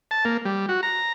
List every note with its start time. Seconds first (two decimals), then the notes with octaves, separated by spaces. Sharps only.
0.11 A5
0.25 A#3
0.45 G3
0.69 F#4
0.83 A#5